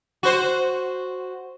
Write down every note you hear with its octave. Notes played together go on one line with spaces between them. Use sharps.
F#4 C5